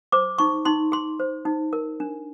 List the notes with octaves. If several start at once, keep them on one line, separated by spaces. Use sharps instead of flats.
C5 D6
D#4 C#6
D#4 C6
G#4 C6
C5
D#4
A#4
D4